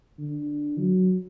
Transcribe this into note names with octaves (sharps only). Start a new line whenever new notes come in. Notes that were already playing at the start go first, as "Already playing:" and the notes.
D3
F#3